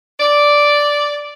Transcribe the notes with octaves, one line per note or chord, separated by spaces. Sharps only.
D5